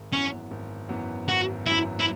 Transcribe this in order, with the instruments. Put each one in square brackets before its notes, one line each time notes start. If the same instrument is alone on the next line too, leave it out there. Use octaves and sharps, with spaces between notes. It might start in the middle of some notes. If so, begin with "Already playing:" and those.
Already playing: [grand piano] G#1
[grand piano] F#2 E3 B3 [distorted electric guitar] C#4
[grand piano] G#1
F#2 E3 B3
[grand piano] G#1 [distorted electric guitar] F#4
[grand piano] F#2 E3 B3 [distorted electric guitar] E4
[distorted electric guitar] E4